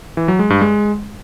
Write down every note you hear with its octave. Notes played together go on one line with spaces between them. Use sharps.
E3
F#3
G#3
G2
G#3